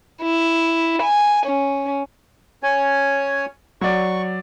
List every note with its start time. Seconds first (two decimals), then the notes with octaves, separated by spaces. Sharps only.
0.22 E4
1.02 G#5
1.46 C#4
2.63 C#4 C#5 G#5
3.81 F#3 D5 C#6